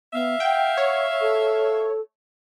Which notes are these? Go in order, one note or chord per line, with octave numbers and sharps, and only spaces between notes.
B3 E5 F5
F#5 G5
C#5
A4